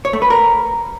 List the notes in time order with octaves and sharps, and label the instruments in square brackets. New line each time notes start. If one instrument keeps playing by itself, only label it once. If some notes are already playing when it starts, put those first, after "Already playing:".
[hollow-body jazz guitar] C#5
A3
B4
A#4